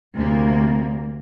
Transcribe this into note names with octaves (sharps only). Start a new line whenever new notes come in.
D2 C3 A#3